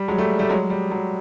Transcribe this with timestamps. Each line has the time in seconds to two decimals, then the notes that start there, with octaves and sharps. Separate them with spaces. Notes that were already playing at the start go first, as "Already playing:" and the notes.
Already playing: G3
0.08 F#3 G#3
0.18 G3 A3
0.39 G3 A3
0.49 F#3 G#3
0.70 G3
0.91 F#3